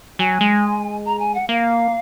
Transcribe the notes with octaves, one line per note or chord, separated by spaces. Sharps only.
F#3 G#5
G#3
A#5
G#5
F#5
A#3 F5